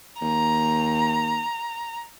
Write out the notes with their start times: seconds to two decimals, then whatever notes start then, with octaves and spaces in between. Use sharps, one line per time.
0.21 D#2 A#5